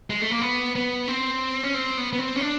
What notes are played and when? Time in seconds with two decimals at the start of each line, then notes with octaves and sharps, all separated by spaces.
0.10 G#3
0.21 A3
0.31 A#3
0.41 B3
0.76 B3
1.08 C4
1.64 C#4
1.74 C4
1.98 B3
2.13 B3
2.19 C4
2.36 C#4
2.41 D4